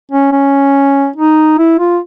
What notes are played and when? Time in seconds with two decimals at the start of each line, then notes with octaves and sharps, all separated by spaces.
0.11 C#4
0.32 C#4
1.16 D#4
1.58 E4
1.79 F4